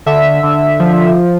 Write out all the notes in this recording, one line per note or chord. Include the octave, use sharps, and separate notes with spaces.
D3 E5
D3
F3